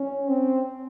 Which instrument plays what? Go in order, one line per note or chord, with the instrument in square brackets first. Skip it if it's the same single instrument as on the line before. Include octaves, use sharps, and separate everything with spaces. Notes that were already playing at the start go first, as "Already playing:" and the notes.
Already playing: [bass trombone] C#4
C4